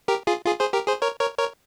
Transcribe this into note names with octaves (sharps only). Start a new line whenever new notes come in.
G4 A#4
F4 G#4
F4 G#4
G#4 C5
G4 A#4
G#4 C5
A#4 C#5
A#4 C#5
A#4 C#5